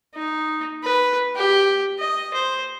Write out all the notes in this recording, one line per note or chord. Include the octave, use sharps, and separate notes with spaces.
D#4
B4
G4
D#5
C5